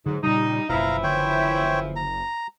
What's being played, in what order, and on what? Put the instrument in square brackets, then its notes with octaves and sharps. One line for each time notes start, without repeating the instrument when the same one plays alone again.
[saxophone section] G#2 [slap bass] D3 E3 F#3
[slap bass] A#2 C#3 [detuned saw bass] G3 [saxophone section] D#4
[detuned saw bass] F#1 [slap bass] F#2 B2 [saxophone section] E3 F3 E4 [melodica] F5 A#5
[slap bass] D3 [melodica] C5 C#5 G5
[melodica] A#5